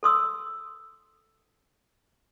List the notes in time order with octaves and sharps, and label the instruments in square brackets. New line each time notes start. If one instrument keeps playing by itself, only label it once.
[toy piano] A4 C6 D#6 E6